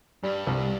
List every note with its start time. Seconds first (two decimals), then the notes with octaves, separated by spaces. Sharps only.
0.23 G2 G3
0.47 C2